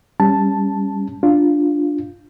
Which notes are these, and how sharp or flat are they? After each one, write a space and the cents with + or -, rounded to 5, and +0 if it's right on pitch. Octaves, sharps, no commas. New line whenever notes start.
G3 +15 C#4 +0 A5 +0
D4 +0 F4 +0